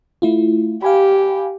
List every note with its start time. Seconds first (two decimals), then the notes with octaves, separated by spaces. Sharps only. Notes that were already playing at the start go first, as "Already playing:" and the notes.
0.22 A3 E4 F4
0.82 G4 F5 G#5 B5